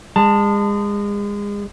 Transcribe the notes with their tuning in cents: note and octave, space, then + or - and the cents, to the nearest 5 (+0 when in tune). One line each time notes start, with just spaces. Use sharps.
G#3 -30 A5 +20